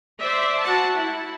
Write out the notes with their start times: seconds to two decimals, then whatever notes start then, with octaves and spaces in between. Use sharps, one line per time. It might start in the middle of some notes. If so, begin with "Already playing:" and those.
0.20 C5 D5 E5
0.61 F#4 F#5 A5
0.94 E4